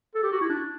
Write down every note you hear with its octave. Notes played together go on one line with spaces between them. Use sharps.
A4
G4
F#4
E4
D4